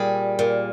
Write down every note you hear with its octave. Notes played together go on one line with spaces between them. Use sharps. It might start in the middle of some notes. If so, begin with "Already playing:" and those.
Already playing: A#2 G3 G#4
A#2